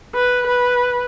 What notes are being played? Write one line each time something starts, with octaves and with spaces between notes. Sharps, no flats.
B4
B4